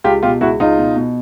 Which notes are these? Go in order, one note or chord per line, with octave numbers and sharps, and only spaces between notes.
C#2 F4 G4
B2 F4 G4
C#2 E4 F#4
C#2 D#4 F4
B2
B2